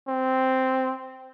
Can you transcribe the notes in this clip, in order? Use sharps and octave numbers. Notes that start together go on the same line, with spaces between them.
C4